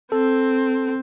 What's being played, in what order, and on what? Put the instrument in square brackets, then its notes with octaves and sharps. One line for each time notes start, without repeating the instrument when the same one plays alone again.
[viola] C4 [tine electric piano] A4